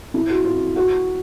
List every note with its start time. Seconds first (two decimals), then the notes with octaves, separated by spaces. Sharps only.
0.14 E4
0.29 F#4
0.44 F4
0.76 F#4